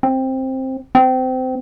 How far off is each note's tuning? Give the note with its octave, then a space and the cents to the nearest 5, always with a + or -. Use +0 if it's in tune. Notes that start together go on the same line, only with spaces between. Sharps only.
C4 +10
C4 -25